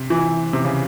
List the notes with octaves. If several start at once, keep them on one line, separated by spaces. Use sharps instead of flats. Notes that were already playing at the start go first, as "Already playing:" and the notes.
Already playing: C3
E3
C3
C#3